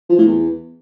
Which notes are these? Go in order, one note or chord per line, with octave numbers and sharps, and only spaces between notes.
F3
A2
E2